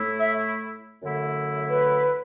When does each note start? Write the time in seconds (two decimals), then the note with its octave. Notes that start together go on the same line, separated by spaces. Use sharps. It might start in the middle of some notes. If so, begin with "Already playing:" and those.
Already playing: A2 A3 E4
0.20 E5
1.03 F#2 D3 A3 E4
1.69 B4